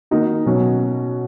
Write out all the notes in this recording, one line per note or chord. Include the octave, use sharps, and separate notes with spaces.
D#3 A#3 D#4 F#4
B2 F#3 C#4